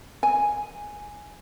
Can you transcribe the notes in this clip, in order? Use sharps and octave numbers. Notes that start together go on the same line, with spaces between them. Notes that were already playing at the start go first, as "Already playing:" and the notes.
G#5